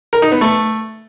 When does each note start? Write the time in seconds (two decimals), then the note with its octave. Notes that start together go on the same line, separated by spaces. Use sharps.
0.13 A#4
0.22 D#4
0.32 B3
0.41 A3